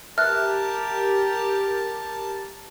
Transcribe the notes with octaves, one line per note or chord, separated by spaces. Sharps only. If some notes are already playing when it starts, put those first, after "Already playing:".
G4 A#4 E5 A5 F6 F#6